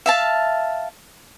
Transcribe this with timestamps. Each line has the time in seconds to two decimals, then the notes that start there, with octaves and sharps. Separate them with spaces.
0.06 E5 F5 A5